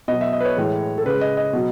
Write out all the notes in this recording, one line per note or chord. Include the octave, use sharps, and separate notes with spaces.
B2 D#5
F#3
E5
D#5
B4
C#5
A2 E3 G#3
A4
C#3 G#3 B4
D#5
D#5
B2 F#3